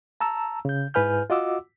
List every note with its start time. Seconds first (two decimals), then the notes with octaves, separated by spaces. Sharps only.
0.20 A5 A#5 E6
0.65 C#3 G6
0.94 G#2 E4 B4 G#5 F6 G6
1.30 F4 F#4 D#5 F#5 D6 E6